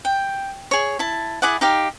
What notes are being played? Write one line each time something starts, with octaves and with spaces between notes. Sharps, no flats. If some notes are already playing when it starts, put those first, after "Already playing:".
G5
G#4 C#5
E4 A5
E4 G#4 D5 F#5
D#4 G4 F5